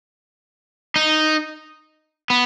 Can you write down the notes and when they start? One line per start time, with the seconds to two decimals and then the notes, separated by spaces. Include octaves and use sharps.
0.96 D#4
2.30 B3